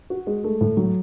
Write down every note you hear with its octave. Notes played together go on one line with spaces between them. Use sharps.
F#4
G#3
A3
A2
F#3